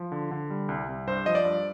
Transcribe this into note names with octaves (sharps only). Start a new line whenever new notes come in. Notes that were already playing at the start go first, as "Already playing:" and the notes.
Already playing: F3
D3
D3
G3
C2
C2
G2 C5
F3 D#5
D5
G2